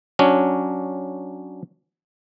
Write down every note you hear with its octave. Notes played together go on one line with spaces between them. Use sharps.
F#3 C#4 D4